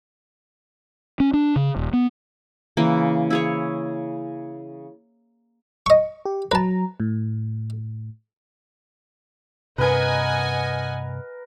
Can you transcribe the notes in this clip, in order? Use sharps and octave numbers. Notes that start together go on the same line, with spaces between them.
C#4
D4
C#3
D#1
B3
C#3 E3 A#3
E4 G#4 C#5
D#5 C#6
G4
F#3 B4 A5 A#5
A2
G2 C3 A#4 B4 D#5 F#5 G#5